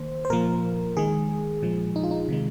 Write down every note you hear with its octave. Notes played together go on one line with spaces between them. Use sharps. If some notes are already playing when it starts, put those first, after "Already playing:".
Already playing: D#3 A#3 C5
C5
A#2 F3 A#3 A#4
D#3 G#3 G#4
A#2 F3 G#3
D#4
F4
D#4
C3 D#3 G#3